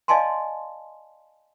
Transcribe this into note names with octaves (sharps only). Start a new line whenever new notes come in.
D5 D#5 F5 G#5 A5 C6